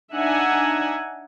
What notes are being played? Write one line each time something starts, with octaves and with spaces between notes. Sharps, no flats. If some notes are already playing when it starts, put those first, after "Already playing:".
D4 D#4 E5 F#5 G#5 A#5